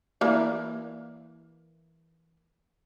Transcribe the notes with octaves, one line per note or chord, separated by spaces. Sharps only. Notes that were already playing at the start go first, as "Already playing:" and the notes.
E3 A#3 D5